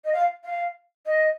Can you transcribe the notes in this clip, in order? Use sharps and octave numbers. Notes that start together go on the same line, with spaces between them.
D#5
F5
F5
D#5